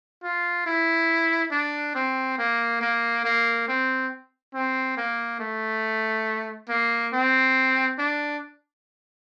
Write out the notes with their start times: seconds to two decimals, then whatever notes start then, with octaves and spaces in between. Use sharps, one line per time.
0.23 F4
0.66 E4
1.51 D4
1.95 C4
2.38 A#3
2.81 A#3
3.25 A#3
3.68 C4
4.54 C4
4.97 A#3
5.40 A3
6.69 A#3
7.13 C4
7.99 D4